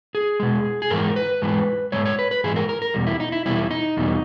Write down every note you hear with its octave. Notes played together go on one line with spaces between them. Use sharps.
G#4
B2 G#3
G#4
G#2 E3 G#3 A#4
B4
G#2 E3 G#3
G#2 E3 G#3 C#5
C#5
B4
B4
G#2 E3 G#3 G#4
A#4
A#4
A#4
E2 B2 G3
E4
D#4
E4
E2 B2 G3 E4
D#4
E2 B2 G3